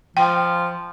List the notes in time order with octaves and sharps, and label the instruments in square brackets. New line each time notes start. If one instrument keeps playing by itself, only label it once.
[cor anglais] F3 [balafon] G5